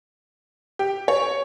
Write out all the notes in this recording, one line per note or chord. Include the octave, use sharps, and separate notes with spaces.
G4
C#5